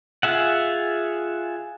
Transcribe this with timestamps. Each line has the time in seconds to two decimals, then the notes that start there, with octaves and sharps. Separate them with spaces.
0.23 F4 G#4 E5 F#5